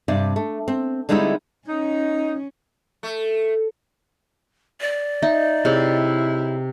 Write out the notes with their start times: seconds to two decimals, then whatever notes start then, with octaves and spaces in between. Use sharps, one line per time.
0.08 G2 C3 D5
0.36 A3
0.68 C4
1.09 D3 G3 G#3 C4 D#4 E4
1.68 C#4 D#4
3.03 A3
4.81 D5
5.22 D#4 E5
5.65 C3 E4 G#4 C#5 D#5